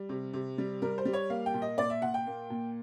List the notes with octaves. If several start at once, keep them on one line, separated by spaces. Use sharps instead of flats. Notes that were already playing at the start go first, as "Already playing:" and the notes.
Already playing: G3
C3
C3
G3
G3 A#4
C5
G3
C#5
A#3 F5
G5
A#2
D#5
A#2 D5
E5
A#2 F#5
G5
A#3
A#2